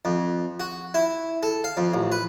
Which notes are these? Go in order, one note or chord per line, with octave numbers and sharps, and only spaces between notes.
F2
F#4
E4
A4
F5
F2
A1
B4